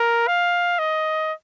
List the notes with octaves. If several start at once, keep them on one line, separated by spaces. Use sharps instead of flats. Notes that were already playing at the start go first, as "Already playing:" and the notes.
Already playing: A#4
F5
D#5